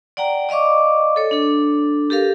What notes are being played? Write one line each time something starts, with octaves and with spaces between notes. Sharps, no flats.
D5 F#5 G5 A#5
D5 D#5 F5 C#6 D6
A4 C#5
D4 A4
G4 A4 A#4 F5